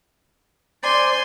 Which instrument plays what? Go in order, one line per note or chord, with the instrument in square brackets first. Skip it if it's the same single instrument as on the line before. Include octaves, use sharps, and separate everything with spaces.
[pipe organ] C5 D5 [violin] G#5 C6